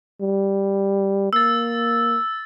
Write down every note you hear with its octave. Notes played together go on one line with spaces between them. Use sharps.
G3
A#3 E6 A6